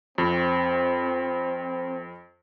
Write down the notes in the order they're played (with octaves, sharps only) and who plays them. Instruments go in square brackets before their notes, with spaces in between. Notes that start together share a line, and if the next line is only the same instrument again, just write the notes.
[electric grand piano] F2 [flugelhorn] C4